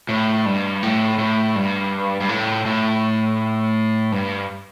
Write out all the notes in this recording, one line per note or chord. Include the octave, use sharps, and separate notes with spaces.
A2
G2
A2
A2
G2
G2
A2
A2
G2